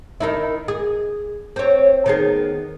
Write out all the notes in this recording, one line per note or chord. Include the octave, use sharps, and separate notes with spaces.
D#3 D#4 E4
G#4
C4 C#5
D#3 B3 G#4